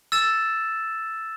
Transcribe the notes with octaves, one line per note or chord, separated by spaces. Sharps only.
E6 A6 E7